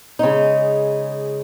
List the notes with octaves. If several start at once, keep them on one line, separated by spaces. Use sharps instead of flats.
C#3 G#3 D#4